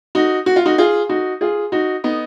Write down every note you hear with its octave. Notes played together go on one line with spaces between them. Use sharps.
D#4 F#4
F#4
F4
D#4 F#4
F4 G#4
D#4 F#4
F4 G#4
D#4 F#4
B3 D#4